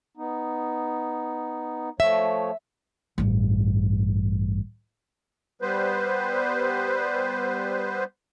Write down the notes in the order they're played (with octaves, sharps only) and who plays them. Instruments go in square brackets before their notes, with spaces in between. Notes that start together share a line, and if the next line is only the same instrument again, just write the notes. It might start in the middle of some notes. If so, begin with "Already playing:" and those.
[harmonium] B3 D#4
[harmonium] F3 A3 C#5 [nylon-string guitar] E5
[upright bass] A1 G2
[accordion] G3 B3 B4 C5